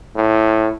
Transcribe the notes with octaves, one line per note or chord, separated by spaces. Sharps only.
A2